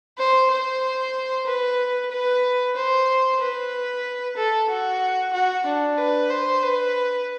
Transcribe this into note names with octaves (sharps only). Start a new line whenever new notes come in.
C5
C5
B4
B4
C5
B4
A4
F#4
F#4
D4
B4
C5
B4